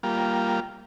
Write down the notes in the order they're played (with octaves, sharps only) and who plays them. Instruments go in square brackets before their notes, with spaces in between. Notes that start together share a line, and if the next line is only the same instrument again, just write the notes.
[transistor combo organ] G3 A#3 F4